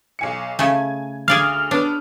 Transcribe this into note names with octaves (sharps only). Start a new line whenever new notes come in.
B1 G#5 C#7
C#3 A3 G#5 G#6
D2 G#4 D5 F5 F6
B3 D4 C#5